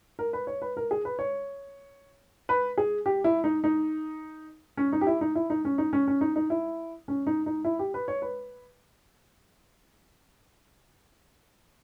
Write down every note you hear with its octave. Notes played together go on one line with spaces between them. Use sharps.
A#4
B4
C#5
B4
A#4
G#4
B4
C#5
B4
G#4
G4
E4
D#4
D#4
C#4
D#4
G4
E4
D#4
E4
D#4
C#4
D#4
C#4
C#4
D#4
D#4
E4
C#4
D#4
D#4
E4
G4
B4
C#5
B4